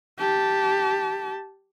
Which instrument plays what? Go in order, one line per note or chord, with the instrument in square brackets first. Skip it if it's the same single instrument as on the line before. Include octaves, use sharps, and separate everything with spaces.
[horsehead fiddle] G4 A5